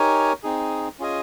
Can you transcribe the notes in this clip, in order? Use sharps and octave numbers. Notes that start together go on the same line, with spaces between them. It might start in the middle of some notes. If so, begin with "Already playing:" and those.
Already playing: D#4 G4 A#4 C#5 G#5
C4 D#4 G#4
C#4 F4 G#4 D#5 G#5